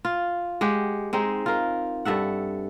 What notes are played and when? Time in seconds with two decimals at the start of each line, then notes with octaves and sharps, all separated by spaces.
0.05 F4
0.61 G#3 G4 F#5
1.13 G#3 C4 D#4
1.46 F4 A#4
2.05 G2 A4 E5 F#5